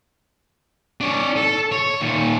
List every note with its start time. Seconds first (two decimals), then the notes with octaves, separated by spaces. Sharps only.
1.01 D4 C#5
1.37 A4
1.72 C#5
2.01 A#2 D#3